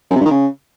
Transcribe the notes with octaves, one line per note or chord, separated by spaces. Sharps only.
F#2
C3
G2
D#3
C#3